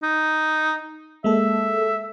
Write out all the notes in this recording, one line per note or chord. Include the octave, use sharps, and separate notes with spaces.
D#4
G#3 A#3 A4 E5